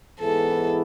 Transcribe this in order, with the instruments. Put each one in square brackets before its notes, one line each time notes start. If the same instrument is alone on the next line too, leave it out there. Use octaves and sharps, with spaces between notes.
[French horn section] G#2 E3 B3 E4 G#4 [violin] A4